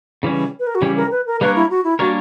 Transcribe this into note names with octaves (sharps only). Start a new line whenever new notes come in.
C#3 E3 G3 C#4
B4
A#4
F#4
C#3 E3 G3 C#4 G4
A#4
B4
A#4
G3 A#3 D4 A#4 B4 C#5
E4
F#4
E4
G3 A#3 D4 F#4 A#4 C#5